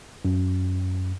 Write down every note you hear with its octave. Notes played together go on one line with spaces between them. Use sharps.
F#2